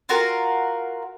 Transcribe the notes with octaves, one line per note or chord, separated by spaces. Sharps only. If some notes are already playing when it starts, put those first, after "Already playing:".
F4 F#4 A#4